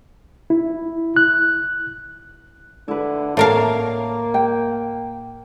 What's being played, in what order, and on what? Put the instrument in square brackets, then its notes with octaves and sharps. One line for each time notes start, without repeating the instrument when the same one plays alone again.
[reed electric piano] E4
F#6
[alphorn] D3 [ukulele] E4 B4
[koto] A2 A#4 F5 [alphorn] A#3 [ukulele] C#5 A5
[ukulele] G5